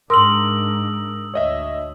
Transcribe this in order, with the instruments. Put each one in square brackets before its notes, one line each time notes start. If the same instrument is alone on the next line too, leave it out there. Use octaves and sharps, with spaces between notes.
[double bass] G#2 D4 [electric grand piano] A#4 [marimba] C6 [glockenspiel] D#6 E6 F#7
[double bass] D2 [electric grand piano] C#5 D#5 E5